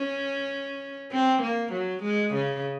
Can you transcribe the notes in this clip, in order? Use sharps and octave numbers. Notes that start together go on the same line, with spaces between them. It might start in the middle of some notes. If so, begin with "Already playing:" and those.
Already playing: C#4
C4
A#3
F#3
G#3
C#3